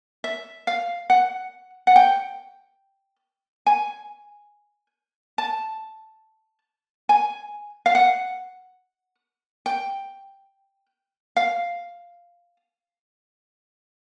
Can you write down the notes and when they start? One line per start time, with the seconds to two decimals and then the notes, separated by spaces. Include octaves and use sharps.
0.24 E5
0.67 F5
1.10 F#5
1.87 F#5
1.96 G5
3.66 G#5
5.38 A5
7.09 G#5
7.86 F5
7.95 F#5
9.66 G5
11.37 F5